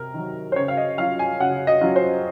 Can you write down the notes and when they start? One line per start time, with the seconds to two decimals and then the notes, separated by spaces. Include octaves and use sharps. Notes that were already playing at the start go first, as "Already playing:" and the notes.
Already playing: C3 A#4
0.14 D#3 F#3
0.52 C5
0.56 C#3 C#5
0.68 F5
0.77 D#5
0.98 F#3 C#4 F4 F5
1.19 G#5
1.40 C#3 F#5
1.67 D#5
1.81 F#3 C#4 F4
1.96 C5